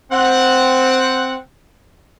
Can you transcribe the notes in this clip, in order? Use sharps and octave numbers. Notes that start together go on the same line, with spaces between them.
C4 F#5